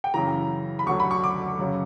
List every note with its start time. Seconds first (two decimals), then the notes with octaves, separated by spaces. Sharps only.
0.04 G5
0.14 F#2 C#3 E3 A#5
0.79 B5
0.86 D2 D3 F#3 C#6
1.00 B5
1.11 C#6
1.24 D6
1.59 F#2 C#3 F#3